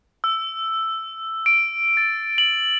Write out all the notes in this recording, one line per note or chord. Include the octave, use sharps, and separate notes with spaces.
E6
D7
A6
F#7